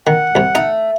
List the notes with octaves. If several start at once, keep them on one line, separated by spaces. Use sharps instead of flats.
D#3 F#5
C2 C3
A3 D#4